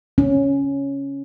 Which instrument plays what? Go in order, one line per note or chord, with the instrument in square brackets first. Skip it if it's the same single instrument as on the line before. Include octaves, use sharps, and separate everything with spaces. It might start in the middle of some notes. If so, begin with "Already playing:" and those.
[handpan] C#4